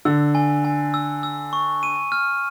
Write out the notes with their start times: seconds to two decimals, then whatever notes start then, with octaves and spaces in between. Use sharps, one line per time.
0.05 D3 E6
0.35 G#5
0.65 G#5
0.94 E6
1.23 E6
1.53 C#6
1.83 D#7
2.12 F6